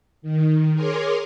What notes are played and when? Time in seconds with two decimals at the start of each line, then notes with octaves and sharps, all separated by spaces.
0.22 D#3
0.74 G#4 A#4 C#5 C6 D6